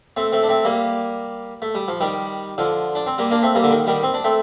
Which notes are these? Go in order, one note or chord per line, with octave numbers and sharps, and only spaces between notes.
A3 C4
A3 C4
D4
A3 C4
G3 A#3
A3
G3
F3
D#3 G3
D3 F3
D4
C4
G3 A#3
A#3 D4
A3 C4
G3 A#3
D3
D#3
D#3 G3
C4
D4
A3 C4